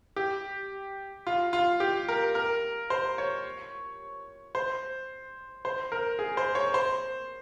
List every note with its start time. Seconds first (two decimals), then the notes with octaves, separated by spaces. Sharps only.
0.16 G4
1.27 F4
1.53 F4
1.80 G4
2.09 A#4
2.35 A#4
2.90 C5
3.18 C#5
4.55 C5
5.65 C5
5.92 A#4
6.19 G#4
6.37 C5
6.55 C#5
6.74 C5